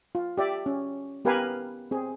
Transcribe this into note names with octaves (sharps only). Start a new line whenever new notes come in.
F4
G4 D5 E5
C#4
B3 G4 A#4 B4 F5 G#5
C4 G#4